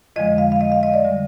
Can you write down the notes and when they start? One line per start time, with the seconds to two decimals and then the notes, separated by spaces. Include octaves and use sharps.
0.16 F2 D3 F3 G#3 D#5
0.38 F5
0.52 F5
0.61 D#5
0.72 F5
0.83 D#5
0.94 D5
1.04 D3 G3